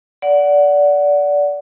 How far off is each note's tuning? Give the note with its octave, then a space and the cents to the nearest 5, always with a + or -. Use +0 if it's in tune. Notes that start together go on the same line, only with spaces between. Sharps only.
D5 -20 F#5 +0